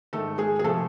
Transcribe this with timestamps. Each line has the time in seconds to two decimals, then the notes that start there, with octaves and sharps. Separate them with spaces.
0.13 G#2 D#3 A3 A4
0.38 G#3 G#4
0.59 G#4
0.64 C3 F3 A3 A4